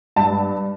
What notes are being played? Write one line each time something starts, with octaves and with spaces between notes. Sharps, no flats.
G2 A5